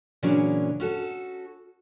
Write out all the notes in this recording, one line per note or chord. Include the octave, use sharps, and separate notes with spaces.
A#2 C#3 E3 F#3 C#4 D4
C#4 F#4 A4